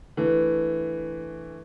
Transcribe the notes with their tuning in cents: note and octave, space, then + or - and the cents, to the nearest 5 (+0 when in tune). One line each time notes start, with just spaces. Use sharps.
E3 +0 A3 +0 D4 +5